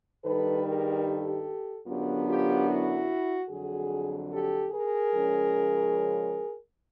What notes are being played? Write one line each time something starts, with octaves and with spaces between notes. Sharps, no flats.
G2 D#3 G3 A4 B4
G#4 A#4
G4 A4
F#2 D3 F#3 B3 D4 F4 G4
F4 G4
E4 F#4
F2 D3 F#3 F#4 G#4
G4 A4
G#4 A#4
C#3 F3 G#3 C#4